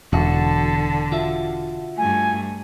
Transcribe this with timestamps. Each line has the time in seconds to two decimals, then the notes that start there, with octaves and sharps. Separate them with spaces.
0.13 E1 D3 F#4 A5
1.12 F4 F#4 E5
1.97 G2 A3 G#5